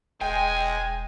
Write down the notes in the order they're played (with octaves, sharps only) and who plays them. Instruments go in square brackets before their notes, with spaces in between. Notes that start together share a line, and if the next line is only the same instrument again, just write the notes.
[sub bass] E1 [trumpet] G#3 [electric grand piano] G5 [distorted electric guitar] G#5